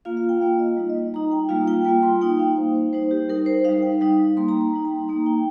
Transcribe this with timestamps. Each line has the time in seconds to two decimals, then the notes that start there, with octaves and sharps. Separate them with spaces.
0.05 A#3 F4 F5
0.17 F5
0.29 G5
0.41 A#3 F4 F5
0.59 D#5
0.77 G3 D#4
0.89 D#5
1.13 G3 D#4 A#5
1.32 G5
1.49 G3 A#3 F4 F5
1.67 G5
1.85 G3 A#3 F4 G5
2.03 C6
2.21 A#3 D#4 G5
2.39 F5
2.57 A#3 D#4 C5
2.75 C5
2.93 G3 D#4 C5
3.11 G4
3.29 G3 D#4 A#4
3.46 C5
3.64 G3 D#4 F5
3.82 G5
4.01 G3 D#4 F5
4.37 G3 A#3 D#4 C6
4.48 A#5
4.61 A#5
4.73 G3 A#3 D#4 G5
4.85 A#5
4.96 C6
5.09 A#3 D#4 A#5
5.26 G5